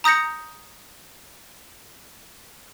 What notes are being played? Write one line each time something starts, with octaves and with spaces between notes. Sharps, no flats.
A#5 D#6 G6 A#6 C#7